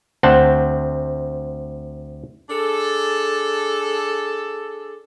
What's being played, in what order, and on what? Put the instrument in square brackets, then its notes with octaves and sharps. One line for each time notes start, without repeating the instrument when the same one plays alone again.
[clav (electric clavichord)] D2 C4 F#5 A5
[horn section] D4 G#4 A4